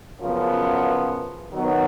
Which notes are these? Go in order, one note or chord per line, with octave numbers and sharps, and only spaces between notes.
F#2 C#3 F3 B3
D#3 F#3 B3